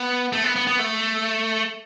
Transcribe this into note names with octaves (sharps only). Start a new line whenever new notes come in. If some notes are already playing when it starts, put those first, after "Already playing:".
Already playing: B3
A3
B3
B3
B3
A3